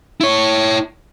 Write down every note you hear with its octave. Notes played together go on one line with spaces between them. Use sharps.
E4 C#5